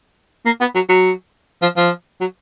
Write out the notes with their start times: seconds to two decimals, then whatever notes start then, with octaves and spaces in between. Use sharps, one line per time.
0.46 A#3
0.61 B3
0.75 F#3
0.89 F#3
1.62 F3
1.77 F3
2.20 F#3